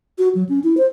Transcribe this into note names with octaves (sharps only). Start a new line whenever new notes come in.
F#4
F#3
C#4
E4
C5